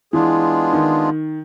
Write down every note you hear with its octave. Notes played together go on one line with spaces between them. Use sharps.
E3 G#3 B3 D4 F4 G#4
D#3